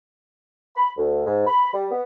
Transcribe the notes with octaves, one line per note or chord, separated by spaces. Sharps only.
B5
D2
G#2
B5
G3
B3